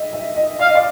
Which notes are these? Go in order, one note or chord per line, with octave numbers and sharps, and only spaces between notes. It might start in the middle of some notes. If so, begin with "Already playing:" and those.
Already playing: D#5 E5
E5
D#5
D5 F5
D#5
D5